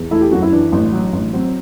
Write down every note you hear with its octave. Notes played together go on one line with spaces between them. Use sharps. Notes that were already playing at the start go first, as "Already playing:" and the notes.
Already playing: E2
A3 E4
G4
F#2 F#4
E4
E3 D4
A1
F#3
A1
F#3 C4